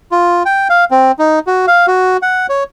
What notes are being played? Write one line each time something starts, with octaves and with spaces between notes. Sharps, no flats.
F4
G5
F5
C4
D#4
F#4
F5
F#4
F#5
C#5